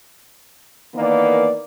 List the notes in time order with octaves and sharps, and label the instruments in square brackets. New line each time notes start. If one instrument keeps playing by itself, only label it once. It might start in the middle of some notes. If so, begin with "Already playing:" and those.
[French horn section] D#3 E3 A#3 B3 D5